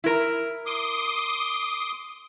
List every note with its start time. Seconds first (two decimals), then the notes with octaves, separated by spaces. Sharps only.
0.04 E4 A#4
0.66 C6 D6 D#6